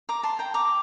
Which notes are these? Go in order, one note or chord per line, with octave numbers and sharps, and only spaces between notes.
A#5 D6
A5 C6
G5 A#5
A#5 D6